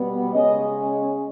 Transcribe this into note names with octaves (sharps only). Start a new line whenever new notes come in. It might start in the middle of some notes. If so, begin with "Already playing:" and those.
Already playing: B2 G3 B3
C#3 G#3 C#4 D#5